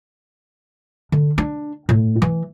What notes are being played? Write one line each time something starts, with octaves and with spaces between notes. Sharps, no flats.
D3
D4
A2
E3